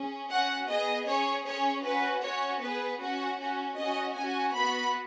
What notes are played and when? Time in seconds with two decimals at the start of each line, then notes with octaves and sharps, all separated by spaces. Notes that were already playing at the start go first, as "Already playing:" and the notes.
Already playing: C#4 G#4
0.30 C#4 F#4 F#5
0.68 B3 G#4 D#5
1.07 C#4 G#4 C#5
1.46 C#4 G#4 C#5
1.84 C#4 F#4 B4
2.23 C#4 F#4 C#5
2.61 B3 G#4 B4
3.01 C#4 F#4
3.39 C#4 F#4
3.77 C#4 F#4 D#5
4.16 C#4 F#4 G#5
4.54 B3 F#4 B5